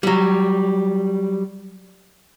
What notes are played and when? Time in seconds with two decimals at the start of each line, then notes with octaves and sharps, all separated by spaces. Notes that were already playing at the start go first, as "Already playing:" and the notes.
0.03 F#3 G3